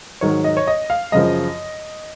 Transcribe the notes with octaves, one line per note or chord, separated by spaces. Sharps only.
G#2 D#3 F#3 C#5
D#5
C#5
D#5
F5
F#2 C#3 F3 D#5